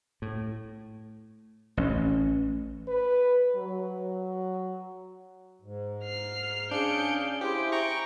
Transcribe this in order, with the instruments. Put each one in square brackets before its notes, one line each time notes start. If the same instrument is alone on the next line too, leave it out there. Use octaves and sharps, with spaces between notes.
[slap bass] A2
A1 C#4
[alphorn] B4
F#3
[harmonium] G#2
[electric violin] F6 C7
[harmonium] C#4 G#4 F5 [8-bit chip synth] D4 C#7 [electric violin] G6 D7
[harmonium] E4 G#4 C5 [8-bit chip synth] G4 [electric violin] D7
[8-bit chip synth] G5 A#5 C#6